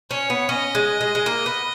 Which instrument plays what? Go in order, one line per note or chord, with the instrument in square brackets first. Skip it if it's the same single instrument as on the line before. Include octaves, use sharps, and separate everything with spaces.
[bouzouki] C#4 [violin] C#5
[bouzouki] B3
[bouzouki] C#4 [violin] D#5
[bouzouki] G#3
G#3
G#3
A#3
B3